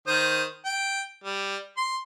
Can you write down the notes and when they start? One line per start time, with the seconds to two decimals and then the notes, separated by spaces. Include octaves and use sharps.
0.07 D#3 C5 D#6
0.65 G5
1.24 G3
1.77 C6